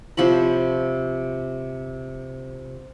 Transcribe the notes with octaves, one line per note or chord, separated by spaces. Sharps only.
C3 F3 C#5 B5